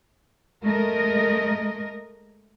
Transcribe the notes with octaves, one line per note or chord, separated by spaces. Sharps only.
G#3 A3 A#4 D#5